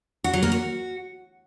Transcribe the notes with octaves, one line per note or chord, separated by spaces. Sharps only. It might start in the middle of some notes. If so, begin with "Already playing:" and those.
F#4
F#3
A#3
F#4